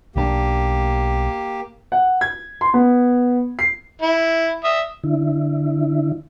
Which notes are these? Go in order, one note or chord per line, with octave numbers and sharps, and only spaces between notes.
B1 D#3 A#3 D4 G4
F#5
G#6
C6
B3
C7
E4
E5 D#6
D3 E4